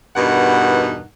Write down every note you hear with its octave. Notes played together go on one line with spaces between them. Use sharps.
E2 G2 B2 D#4 A#4 F#5